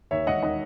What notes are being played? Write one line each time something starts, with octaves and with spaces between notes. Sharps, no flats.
D#2 C#5 E5
E1 D#5 F#5
D#3 D#5 F#5